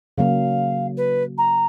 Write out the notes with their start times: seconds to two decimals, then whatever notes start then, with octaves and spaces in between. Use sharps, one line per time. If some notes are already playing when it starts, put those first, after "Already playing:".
0.18 C#3 F#3 A#3 F5
0.97 B4
1.38 A#5